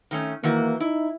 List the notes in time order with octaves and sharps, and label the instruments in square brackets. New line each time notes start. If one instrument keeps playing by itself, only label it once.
[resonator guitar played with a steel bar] D#3 A3 C#4
[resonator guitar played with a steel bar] D#3 E3 F#4 [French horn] A#3
[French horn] D#4 [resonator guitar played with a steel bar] E4